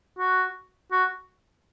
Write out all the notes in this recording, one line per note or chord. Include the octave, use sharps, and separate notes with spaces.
F#4
F#4